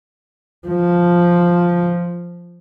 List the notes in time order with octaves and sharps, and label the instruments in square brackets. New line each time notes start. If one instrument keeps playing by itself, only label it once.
[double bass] F3